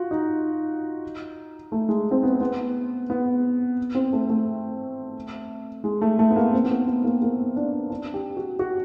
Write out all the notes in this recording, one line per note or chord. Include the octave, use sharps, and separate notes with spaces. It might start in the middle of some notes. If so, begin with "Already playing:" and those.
Already playing: F4 F#4
D#4
A3
G#3
C4
B3
B3
B3
C4
A3
A3
G#3
A3
A3
B3
A#3
C4
B3
A#3
B3
A#3
A#3
D4
D4
G4
F#4
F#4